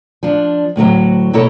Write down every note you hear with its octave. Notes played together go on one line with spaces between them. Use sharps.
F3 D4
D2 A2 D#3 F#3
B2 A#3 E4 A4 C#5